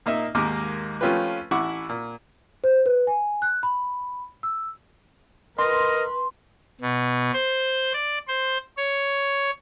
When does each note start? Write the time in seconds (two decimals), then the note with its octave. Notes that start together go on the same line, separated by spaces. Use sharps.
0.06 A#2 A#3 D#4 E5
0.35 D#2 G#2 G#3 A#3 A#4 D6
1.01 F3 A3 C#4 F4 G4 B4
1.51 A1 E4 F#5 C#6 D6
1.89 A#2
2.64 C5
2.86 B4
3.07 G#5
3.42 F#6
3.63 B5
4.43 E6
5.58 A#4 B4 D#5 C6
6.81 B2
7.33 C5
7.94 D5
8.27 C5
8.77 C#5